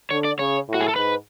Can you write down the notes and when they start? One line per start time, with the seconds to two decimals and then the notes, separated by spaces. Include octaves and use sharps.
0.11 D3 C#5
0.25 D5
0.39 C#3 C#5
0.68 A2
0.74 F#4
0.81 G#4
0.88 A4
0.95 G#2 B4